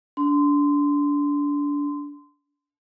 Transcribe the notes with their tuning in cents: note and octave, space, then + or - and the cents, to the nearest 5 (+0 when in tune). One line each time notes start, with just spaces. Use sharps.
D4 -25 C6 -20